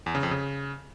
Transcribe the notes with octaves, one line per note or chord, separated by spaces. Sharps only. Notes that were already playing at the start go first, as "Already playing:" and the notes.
E2
C#3
F2
C#3